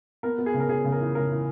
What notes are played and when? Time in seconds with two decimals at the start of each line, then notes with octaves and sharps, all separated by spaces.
0.23 B3 A#4
0.38 B3
0.46 G#4
0.54 C#3
0.60 A#4
0.69 C#3 G#4
0.84 C#3
0.92 A#4
1.00 E3
1.15 C#3 A#4
1.31 E3